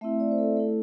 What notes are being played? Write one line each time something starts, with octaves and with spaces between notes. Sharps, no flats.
A3 C4 E4 E5
D5
C5
A4
A3 E4 A4